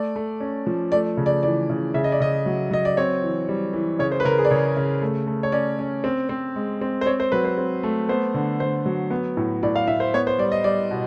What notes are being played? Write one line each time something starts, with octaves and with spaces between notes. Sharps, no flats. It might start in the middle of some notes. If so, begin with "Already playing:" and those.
Already playing: A3 D5
A3
C#4
F3
A3 D5
C#3
D5
E3 D5
C#3
C#3 E5
D#5
D5
C#3 D#5
F#3
F#3 D#5
D5
C4 C#5
E3
G3
E3
C#3 C#5
C5
B4
C#3 A#4
G#4
D5
C#3 C#5
C#3
A3
A3
C#5
C#4 D5
C#4
C4
C4
G#3
C4
C5
C4 C#5
C5
F#3 B4
C5
C4
A3
B3 C5
D3
D3 C5
F#3
B3
A2
A2 D5
F5
A2 E5
C5
B3 C#5
C5
G3 D5
D#5
G3 D5
B2